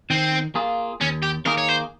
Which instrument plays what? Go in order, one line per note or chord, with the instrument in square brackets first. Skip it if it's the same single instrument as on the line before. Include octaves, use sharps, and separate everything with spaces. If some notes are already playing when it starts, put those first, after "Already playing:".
[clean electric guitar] D#3 [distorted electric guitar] C4
[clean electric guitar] A#3 F4 G#4
[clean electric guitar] D#2 [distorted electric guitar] C#4
[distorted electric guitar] G4
[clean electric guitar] D#3 A#3 D#4 G#4 [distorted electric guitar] A#4
[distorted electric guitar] C#5
C5